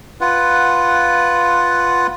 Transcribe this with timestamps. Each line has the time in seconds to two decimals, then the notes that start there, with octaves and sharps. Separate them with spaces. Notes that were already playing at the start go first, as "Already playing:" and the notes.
0.21 F4 B4 F#5